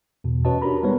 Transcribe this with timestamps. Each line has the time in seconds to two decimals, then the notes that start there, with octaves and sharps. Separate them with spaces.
0.24 E2 B2
0.45 C#4 F#4 B4 C#5 D#5 A5
0.62 D4 F#4 G4 A#4 A#5 B5
0.83 G3 G#3 B3 D#4 B4 C#5